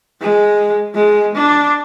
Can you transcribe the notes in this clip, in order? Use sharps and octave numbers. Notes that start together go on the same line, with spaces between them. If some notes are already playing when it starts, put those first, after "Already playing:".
G#3
G#3
D4